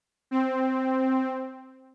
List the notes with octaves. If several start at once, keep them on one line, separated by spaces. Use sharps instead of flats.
C4